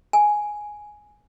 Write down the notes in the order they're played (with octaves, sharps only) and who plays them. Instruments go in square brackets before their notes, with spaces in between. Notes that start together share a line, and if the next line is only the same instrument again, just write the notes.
[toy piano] G#5